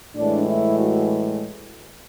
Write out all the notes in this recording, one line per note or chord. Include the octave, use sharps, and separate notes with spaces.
A2 E3 G#3 D4
E4
F#4